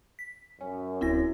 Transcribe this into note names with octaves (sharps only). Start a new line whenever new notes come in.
B6
F#2 C#4
D1 C4 E4 A#6